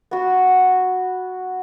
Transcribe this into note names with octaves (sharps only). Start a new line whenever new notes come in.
B3 F#4